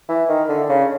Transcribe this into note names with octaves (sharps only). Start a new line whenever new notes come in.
E3
D#3
D3
C#3